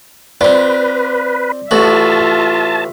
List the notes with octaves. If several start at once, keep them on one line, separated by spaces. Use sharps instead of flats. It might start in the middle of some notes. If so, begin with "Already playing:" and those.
C4 F4 B4 D5
A1 A2 F4 F#4 E5 A5